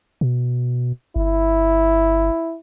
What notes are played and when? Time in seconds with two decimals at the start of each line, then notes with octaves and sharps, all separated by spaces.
0.21 B2
1.16 G1 E4